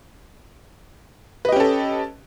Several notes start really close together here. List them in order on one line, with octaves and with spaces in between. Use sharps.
B4 D#5 G4 C#4 A4